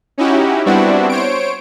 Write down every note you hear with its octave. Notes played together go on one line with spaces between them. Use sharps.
C#4 D#4 E4 F#4 G4
G3 B3 C4 D4 E4 F#4
C5 C#5 D7